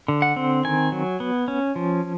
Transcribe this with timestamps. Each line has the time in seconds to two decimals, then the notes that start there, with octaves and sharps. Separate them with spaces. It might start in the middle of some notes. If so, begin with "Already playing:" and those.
0.08 D3
0.22 F#5
0.36 C4
0.64 D#3 G#5
0.92 F#3
1.20 B3
1.48 C#4
1.76 F3